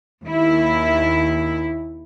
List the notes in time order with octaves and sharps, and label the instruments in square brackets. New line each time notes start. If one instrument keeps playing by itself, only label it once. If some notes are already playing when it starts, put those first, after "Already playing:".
[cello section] D#2 E4